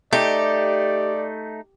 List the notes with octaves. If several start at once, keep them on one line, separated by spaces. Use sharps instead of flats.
A3 D#4 G4 D5